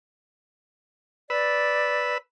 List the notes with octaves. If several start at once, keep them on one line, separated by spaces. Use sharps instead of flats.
B4 D5 B5 E6